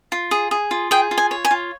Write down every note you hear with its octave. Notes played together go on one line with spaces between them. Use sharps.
F4
G#4
G#4
F4
G#4 G5
F4
G#5
C#5
G#5
F4